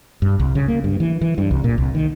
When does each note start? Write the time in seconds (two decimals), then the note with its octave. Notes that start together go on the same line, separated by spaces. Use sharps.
0.22 G2
0.40 C2
0.55 C#3
0.68 A#3
0.84 G2
1.00 E3
1.21 E3
1.38 G2
1.51 C2
1.64 A#2
1.78 C2
1.95 D#3